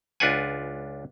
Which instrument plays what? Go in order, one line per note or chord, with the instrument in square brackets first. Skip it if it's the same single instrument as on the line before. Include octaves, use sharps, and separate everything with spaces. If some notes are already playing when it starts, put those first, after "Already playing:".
[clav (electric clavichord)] C#2 D4 F4 B4 F#5 G#5